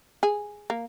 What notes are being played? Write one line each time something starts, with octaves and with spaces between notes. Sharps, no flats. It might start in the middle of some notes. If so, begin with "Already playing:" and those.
G#4
A#3